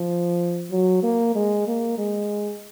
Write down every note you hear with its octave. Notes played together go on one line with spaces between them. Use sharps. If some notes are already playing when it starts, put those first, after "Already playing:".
Already playing: F3
F#3
A#3
G#3
A#3
G#3